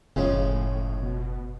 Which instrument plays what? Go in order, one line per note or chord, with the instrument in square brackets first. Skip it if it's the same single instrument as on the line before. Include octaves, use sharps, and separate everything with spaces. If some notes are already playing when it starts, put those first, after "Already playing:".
[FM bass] F#1 [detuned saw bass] A2 [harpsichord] C#3 F3 G#3 [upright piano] C#4
[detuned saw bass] B2